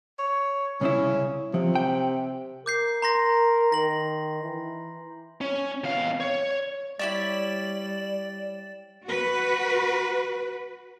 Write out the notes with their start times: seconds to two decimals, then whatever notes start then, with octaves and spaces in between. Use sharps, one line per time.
0.19 C#5
0.81 C2 C#3 C#4 E4
1.54 C3 F3
1.75 G5
2.66 A#4 D6 G6 C7
3.02 A#5 C6 A#6
3.72 D#3 A#6 F#7
4.43 E3
5.41 C#4
5.84 E2 F5
6.20 C#5
6.99 G3 E4 G4 C#5 D5 A6 E7 F#7
9.05 F#4 B4